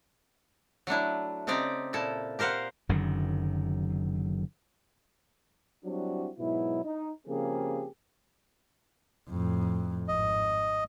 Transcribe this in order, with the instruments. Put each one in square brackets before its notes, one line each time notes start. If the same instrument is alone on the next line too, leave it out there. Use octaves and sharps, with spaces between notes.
[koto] F#3 A3 D4 E4
C#3 C4 D#4 G4 D5
A#2 E4 A4
G4 A#4 C5 F5 F#5
[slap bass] F#1 F#2 D3 D#3
[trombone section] F#3 G3 C4 D4 E4 F#4
G#2 B2 F#3 E4
D#4
C#3 F3 A#3 C4 G4 G#4
[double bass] F2 A2
[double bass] G#1 [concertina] D#5